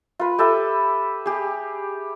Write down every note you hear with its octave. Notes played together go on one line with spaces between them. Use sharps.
F4 B4
G4 A4 B4 E5
G4 G#4